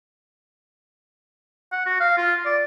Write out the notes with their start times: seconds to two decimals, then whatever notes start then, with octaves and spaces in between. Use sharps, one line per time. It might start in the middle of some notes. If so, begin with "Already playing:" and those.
1.72 F#5
1.86 F#4
2.00 F5
2.17 F4
2.45 D5